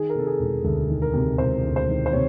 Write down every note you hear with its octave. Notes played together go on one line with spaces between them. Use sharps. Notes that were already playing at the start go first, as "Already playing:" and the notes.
Already playing: D#3 G#4
A#4
C3 A4
G#4
E1
D2 A4
D#3
A#4
C3
E1 C5
D2
C5
D#3
C5
C3 C#5